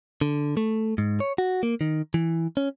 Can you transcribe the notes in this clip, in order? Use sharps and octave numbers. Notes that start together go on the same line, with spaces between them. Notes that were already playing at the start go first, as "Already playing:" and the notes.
D3
A3
G#2
C#5
F#4
A#3
D#3
E3
C#4